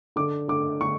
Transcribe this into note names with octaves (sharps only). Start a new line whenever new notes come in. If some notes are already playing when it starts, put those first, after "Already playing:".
D3 D6
D3 D6
D3 C#6